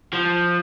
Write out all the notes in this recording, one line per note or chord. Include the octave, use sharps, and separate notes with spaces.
F3